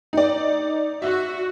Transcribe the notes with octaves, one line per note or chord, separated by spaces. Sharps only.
D#4 D5
F#4 E5